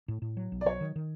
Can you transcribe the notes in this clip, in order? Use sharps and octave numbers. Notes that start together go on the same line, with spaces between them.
A2
A2
F#3
B1
D5
F#3 C#5
D#3
D#3